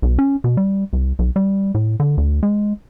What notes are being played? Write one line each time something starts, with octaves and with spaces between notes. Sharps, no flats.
B1
C#4
B2
G3
C2
B1
G3
A2
D3
D2
G#3